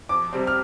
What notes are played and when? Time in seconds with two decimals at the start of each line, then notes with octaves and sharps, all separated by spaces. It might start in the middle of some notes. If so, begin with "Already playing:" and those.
0.09 F2 D6
0.33 C3 G3 C4
0.47 F6